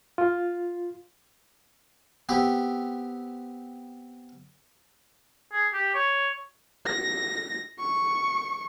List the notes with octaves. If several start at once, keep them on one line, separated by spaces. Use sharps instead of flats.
F4
B3 C4 G4
G#4
G4
C#5
A#6
C#6